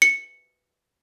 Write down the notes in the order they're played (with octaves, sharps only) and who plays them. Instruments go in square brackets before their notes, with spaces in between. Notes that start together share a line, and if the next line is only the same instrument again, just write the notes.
[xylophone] C#7